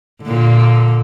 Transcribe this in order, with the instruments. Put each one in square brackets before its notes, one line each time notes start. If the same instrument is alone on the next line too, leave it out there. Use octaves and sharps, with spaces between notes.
[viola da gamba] A#2 D3